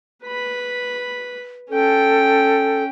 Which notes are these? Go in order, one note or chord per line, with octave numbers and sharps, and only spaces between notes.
B4 B5
C#4 A4 G5